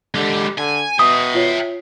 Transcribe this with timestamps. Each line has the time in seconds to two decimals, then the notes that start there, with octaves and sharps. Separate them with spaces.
0.14 D3 G#3 G4
0.58 D3 G#5
0.99 B2 E5 G5 D#6
1.35 F4 C#5